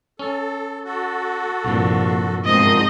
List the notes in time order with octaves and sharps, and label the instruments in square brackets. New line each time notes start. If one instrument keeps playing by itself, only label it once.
[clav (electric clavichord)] C#4 [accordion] A4
[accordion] F#4 A4
[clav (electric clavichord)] C2 G2 [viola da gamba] A#2 F3
[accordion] E2 D#3 F3 [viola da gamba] G#2 C4 [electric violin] D#5